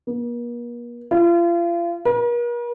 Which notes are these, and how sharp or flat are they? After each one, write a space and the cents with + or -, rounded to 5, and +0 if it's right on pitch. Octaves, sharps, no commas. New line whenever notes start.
A#3 +45
F4 -35
A#4 +45